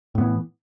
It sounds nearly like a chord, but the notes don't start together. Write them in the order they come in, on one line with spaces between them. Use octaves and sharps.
A2 B3 E3